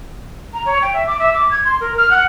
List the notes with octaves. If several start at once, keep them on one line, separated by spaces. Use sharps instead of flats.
A#5
C#5
G5
E5
D6
E5
D6
G#6
C6
A#4
F6
F#5